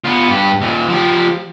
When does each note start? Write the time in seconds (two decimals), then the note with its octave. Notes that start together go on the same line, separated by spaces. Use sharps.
0.04 B3 F4
0.29 G2 G4
0.61 D#2 A#2
0.88 F3 G4